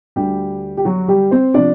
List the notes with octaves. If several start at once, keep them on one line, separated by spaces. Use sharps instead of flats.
D2 D3 G3 G4
G4
F#3 F#4
G3 G4
C4 C5
C3 F3 D4 D5